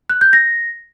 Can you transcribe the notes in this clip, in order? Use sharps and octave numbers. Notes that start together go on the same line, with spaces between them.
F#6
G6
A#6